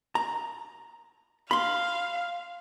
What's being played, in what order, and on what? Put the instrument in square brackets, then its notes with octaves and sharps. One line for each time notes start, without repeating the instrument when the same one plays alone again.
[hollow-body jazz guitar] A#5
[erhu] F5 [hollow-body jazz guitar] B5 C6